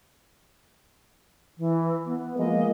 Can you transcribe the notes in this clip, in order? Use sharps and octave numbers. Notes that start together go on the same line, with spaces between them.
E3
B3
F3 G#3 A#3 D#5